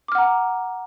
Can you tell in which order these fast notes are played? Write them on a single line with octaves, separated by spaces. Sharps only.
D6 F6 F#5 A#5